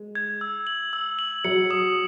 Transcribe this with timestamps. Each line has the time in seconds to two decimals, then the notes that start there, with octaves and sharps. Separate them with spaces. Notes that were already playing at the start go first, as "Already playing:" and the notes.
Already playing: G#3
0.15 G#6
0.41 E6
0.67 F#7
0.93 E6
1.19 F#7
1.44 F#3 C#7
1.71 D#6